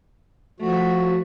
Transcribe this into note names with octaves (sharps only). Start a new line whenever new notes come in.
F3 A3 F#4